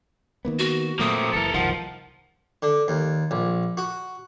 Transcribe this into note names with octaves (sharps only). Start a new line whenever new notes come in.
D#3 A#3 B3
F#4
A#2 F#3 A3 A#3 C4 D#6
F#1 E3 A4 A#4
F#1 C2 D#3 F3 F#5
D3
D#2
A#1
F#4